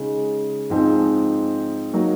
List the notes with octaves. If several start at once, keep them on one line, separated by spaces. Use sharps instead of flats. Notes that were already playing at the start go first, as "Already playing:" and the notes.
Already playing: C#3 G#3 D#4 G#4
G#2 F3 C4 D#4 G#4
F#3 A#3 D#4